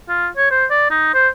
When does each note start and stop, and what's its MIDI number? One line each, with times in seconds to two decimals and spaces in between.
0.08 0.29 65
0.37 0.51 73
0.51 0.66 72
0.70 0.88 74
0.91 1.14 63
1.14 1.28 72